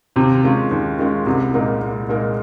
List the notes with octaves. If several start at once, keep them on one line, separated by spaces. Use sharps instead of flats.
D#2 C3
D#3 G#3 C#4 F4
D#2
D#3 G#3 C#4 F4
C2 C3
A#2 G#3 D#4 A#4
C2
A#2 G#3 D#4 A#4